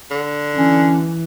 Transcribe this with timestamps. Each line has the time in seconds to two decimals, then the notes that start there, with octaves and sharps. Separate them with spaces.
0.11 D3
0.56 E3 C#4